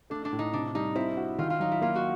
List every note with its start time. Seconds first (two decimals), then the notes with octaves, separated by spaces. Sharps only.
0.10 A3 D4
0.25 D4
0.33 A2
0.39 D#4
0.53 C3 D4
0.75 G3 D#4
0.96 C4 E4
1.17 F#4
1.38 D#3 F4
1.50 F4
1.60 F#3 D#4
1.72 E4
1.82 A#3 F4
1.95 F#4